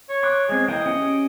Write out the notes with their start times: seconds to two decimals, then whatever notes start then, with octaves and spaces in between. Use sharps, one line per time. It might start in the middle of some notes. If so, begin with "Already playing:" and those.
0.09 C#5
0.23 C6 D6 F#6
0.49 G#3 C4 G#4
0.68 E3 A#3 D#5 G5
0.86 C#4 G4